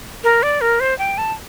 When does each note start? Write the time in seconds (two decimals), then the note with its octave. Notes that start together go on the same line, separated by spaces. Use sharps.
0.24 A#4
0.43 D5
0.61 A#4
0.80 C5
0.99 G5
1.18 A5